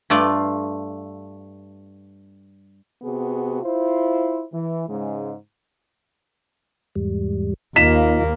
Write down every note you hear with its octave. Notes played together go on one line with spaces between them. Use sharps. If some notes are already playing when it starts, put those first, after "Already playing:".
G2 A3 F4 D5 F5
C3 B3 F#4 G#4
E4 F4 C5
E3
G#2 C#3 G#3
E2 G#2 G3
D#2 A#3 D#4 F4 B6 E7